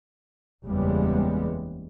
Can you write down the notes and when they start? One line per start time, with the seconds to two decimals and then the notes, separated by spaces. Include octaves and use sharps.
0.64 F#1 E2 C#3 G3 G#3 B3